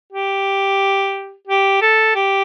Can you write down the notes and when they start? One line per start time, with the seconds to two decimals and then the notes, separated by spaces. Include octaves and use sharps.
0.12 G4
1.47 G4
1.81 A4
2.15 G4